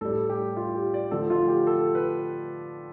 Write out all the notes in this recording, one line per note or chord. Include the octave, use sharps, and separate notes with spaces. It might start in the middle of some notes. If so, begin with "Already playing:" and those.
A2 G3 A4
G4
F4
G4
D5
D3 F3 A3 A4
F4
G4
A4
B4